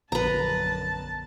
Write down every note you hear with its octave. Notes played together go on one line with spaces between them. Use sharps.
A#1 F#2 D3 B3 B4 A5 A#5